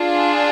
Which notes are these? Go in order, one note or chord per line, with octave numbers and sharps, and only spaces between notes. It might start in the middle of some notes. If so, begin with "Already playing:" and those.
Already playing: D4 F4 G#4